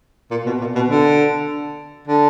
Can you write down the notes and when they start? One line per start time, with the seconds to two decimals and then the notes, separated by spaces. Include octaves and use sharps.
0.31 A#2
0.46 B2
0.61 A#2
0.76 B2
0.90 D3
2.08 D3